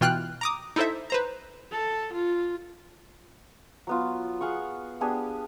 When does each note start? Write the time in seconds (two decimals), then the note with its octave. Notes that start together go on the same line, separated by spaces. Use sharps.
0.01 B2 E3 F4 G5 F6 F#6
0.41 A#5 D6 D#6
0.76 D#4 E4 A4 C5 E5
1.10 B4 C5 A#5
1.71 A4
2.12 F4
3.87 F#3 B3 F4
4.41 G#4 F5 F#5 C#6
5.01 B3 D4 G4 G#4